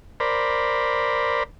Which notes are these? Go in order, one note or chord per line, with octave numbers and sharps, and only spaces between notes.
A#4 C5 D5 B5